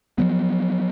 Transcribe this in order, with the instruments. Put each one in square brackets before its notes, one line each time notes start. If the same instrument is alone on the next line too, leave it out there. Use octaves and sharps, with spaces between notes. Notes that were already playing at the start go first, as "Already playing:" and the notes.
[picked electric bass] F3 F#3 B3